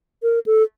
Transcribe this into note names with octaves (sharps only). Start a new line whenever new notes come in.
A#4
A4